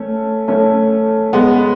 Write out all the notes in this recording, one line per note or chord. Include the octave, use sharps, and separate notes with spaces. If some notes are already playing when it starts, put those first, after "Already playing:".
Already playing: A3 C#4
A3 C#4
G#3 B3